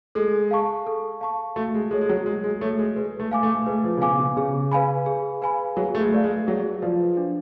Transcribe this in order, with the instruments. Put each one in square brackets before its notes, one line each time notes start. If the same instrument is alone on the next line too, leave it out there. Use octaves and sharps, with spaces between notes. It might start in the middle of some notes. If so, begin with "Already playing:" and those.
[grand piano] G#3 [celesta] A4
[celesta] F5 A5 C#6
A4
F5 A5 C#6
[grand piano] A3 [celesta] F#4
[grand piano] G#3
[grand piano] G#3 [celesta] A4 C#5
[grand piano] G#3
F#3
[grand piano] G#3 [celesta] F#4
[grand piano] G#3
[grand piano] A3 [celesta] A4 C#5
[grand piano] G#3
[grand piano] G#3 [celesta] B4
[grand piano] A3
[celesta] F5 G#5 D6
[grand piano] A3
A3
[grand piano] G#3 [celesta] B4
[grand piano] F3
C#3
[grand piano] B2 [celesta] F5 G#5 D6
[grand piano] B2
[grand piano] C#3 [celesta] G#4
[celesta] B4 F5 G#5 B5
G#4
B4 F5 G#5 B5
[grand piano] F#3 [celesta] G#4
[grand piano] A3
G#3
[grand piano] A3 [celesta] B4 D5 F5
[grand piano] G#3
[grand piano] F#3 [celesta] G#4
[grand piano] F3 [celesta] B4 D5 F5
[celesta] D4